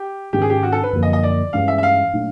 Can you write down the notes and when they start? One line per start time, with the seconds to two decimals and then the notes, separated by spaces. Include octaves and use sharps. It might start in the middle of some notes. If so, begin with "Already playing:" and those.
Already playing: G4
0.33 G#2 D#3 G#3 C#4 G4
0.42 G#4
0.50 G4
0.63 F#4
0.72 A4
0.83 B4
0.93 F#2 D3 F3 A#3
1.03 D#5
1.13 D#5
1.23 D5
1.53 G2 E3 G#3 C#4 F5
1.68 E5
1.78 E5
1.83 F5
2.13 A#2 F#3 A3 D4